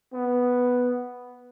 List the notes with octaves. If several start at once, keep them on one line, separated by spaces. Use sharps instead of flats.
B3